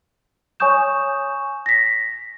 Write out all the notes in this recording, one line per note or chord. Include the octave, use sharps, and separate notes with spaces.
C#5 G#5 C#6 D#6 G6 E7
A#6 B6